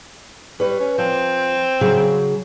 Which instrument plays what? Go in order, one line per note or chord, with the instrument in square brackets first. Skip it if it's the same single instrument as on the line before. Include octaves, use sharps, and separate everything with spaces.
[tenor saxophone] G3 [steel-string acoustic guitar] B4 C#5
[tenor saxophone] C#4
[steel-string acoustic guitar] F3 [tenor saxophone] C4
[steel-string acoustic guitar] C#3 F#3 G#4